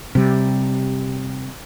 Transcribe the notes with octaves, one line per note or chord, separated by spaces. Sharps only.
C3 G3